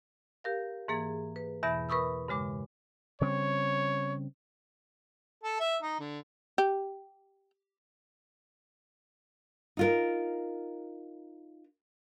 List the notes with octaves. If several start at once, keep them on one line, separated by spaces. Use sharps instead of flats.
G4 A#4 F5
G#2 E3 A#3 G#4 A6
B4
E2 B2 E3 E5 B5 A#6
A#4 B4 B5 C#6 D#6 E6
G2 C#3 G#3 D6
C#3 G3 C4 C#5
A4
E5
D#4
D3
G4
D#4 F4 A#4